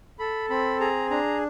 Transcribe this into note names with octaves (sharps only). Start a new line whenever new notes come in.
A4 B5
C4 B5
G#4 A#5
D4 A#5